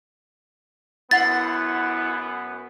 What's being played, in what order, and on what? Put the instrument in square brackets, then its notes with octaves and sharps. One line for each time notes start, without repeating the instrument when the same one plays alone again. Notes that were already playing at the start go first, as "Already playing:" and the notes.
[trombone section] F#2 B3 [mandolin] E4 F#5 C6 [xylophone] A6